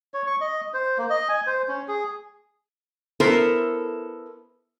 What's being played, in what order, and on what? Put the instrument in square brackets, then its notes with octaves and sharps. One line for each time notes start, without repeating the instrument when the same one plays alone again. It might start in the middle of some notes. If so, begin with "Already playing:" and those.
[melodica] C#5
C#6
D#5
C5
A#3
D#5
G#5
C5
C#4
G#4
[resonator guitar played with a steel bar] B3 E4 A4 A#4 C5